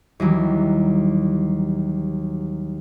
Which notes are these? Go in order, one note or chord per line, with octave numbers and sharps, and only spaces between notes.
D#2 E3 F#3 G3